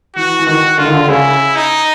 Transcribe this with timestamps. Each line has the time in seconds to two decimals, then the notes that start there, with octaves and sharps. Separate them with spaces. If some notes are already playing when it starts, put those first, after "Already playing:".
0.15 E3 F#4
0.39 E3
0.46 D#3 F#4
0.78 D3 F4
0.85 D#3
0.93 D3
1.08 C#3 E4
1.55 D#4